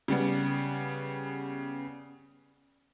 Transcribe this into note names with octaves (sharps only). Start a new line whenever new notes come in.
C#3 G3 B3